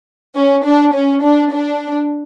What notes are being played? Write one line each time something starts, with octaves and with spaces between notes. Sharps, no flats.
C#4
D4
C#4
D4
D4